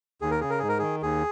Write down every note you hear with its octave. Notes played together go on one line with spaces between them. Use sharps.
D#2 G#4
A#4
C#3 G#4
A#4
G#2 G#4
A#4
D#3 G#4
D#2 G#4